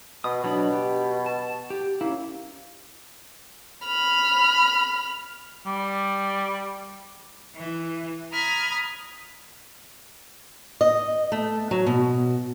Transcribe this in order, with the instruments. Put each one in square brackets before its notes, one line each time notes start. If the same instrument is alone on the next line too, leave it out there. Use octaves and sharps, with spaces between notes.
[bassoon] B2 [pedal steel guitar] D#6
[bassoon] B2 [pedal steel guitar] F#3 D4 B5
[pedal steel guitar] G4
A5
G4
[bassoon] A#3 [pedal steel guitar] C#4 E4
[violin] B5 F6
[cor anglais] G3
[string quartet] E3
A#5 B5 D#6 F6 G#6
[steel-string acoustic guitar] D#5
A3
F#3
B2